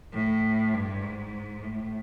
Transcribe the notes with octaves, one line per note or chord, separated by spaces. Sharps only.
A2
G2
G#2
A2